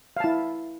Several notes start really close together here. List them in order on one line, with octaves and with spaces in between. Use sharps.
F5 A5 E4